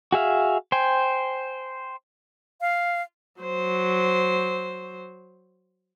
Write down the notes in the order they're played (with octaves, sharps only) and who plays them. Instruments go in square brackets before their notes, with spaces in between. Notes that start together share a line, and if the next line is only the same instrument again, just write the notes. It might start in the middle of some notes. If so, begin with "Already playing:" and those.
[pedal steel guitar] F#4 G#4 E5 F5
C5 G5 G#5
[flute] F5
[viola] F#3 C5